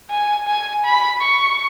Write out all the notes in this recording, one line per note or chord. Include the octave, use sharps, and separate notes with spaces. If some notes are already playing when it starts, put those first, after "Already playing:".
G#5
G#5
B5
C#6